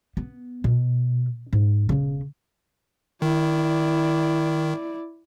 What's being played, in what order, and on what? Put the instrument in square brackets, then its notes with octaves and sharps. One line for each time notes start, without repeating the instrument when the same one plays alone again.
[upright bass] B3
B2
G#2
E1 C#3
[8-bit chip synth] D#3 [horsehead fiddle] E4 D5